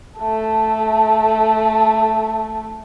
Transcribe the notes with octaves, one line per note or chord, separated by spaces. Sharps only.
A3 A4